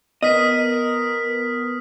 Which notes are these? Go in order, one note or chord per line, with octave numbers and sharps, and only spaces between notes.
B3 A#4 D#5 D#6 F6 B6